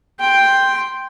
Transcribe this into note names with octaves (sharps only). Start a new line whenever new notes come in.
G5 C6